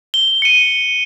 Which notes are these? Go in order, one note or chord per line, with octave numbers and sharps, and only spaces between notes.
G7
C#7 D#7